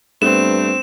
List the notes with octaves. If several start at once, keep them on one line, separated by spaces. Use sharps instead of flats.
G2 A3 B3 C4 E7